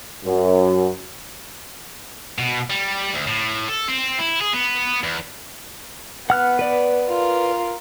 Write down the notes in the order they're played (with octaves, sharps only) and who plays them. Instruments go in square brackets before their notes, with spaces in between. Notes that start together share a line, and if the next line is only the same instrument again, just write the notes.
[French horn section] F#2
[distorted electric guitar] B2
G3
D2
A2
A4
C4
E4
G#4
B3
E2
[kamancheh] B3 [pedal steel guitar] F#5 F6 F#6
[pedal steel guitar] B4 D5
[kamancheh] F4 A#4